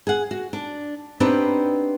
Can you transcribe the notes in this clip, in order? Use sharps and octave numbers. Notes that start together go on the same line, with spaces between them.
G#4 F#5
F#4
D4
B3 C4 D4 D#4 G4 B4